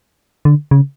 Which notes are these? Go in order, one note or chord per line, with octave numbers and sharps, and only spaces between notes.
D3
C#3